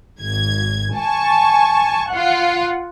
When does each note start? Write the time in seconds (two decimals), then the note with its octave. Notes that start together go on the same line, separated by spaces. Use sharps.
0.21 G#1 G#6
0.94 G#5 A5 C#6
2.09 F4 F#5